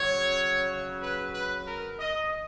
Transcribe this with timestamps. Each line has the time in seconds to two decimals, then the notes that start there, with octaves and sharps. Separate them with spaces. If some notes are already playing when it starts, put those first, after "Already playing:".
Already playing: C#3 F#3 C#5
1.03 B4
1.35 B4
1.66 A#4
1.99 D#5